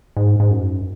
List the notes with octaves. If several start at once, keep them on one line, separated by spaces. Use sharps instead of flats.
G#2
G#2
F#2